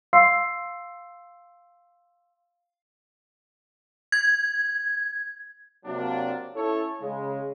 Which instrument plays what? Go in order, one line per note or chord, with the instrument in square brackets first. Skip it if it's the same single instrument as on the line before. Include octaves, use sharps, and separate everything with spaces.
[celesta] F5 C6 E6 C7
[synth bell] G#6
[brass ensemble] C3 F#3 A#3 D4
C#4 E4 A4 C#5
C#3 G#3